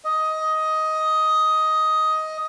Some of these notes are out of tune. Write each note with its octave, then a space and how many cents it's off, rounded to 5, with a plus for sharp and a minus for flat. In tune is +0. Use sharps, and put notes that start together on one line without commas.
D#5 +10